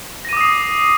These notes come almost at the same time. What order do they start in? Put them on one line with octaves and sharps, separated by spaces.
A#6 D#7 D6 D#6 C7